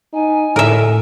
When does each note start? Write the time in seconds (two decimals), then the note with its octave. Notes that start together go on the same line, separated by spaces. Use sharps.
0.14 D#4 G#5
0.56 A2 A3 A#4 E5